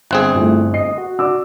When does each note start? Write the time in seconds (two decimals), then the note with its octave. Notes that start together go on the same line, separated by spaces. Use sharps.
0.11 G1 C4 G#4 F#6
0.35 G2 A3 E4 F4
0.74 D#5 C7
0.98 F#4
1.19 F#4 D5 D6 E6